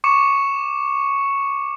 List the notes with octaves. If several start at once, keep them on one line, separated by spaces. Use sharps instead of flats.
C#6 D6 C#7 E7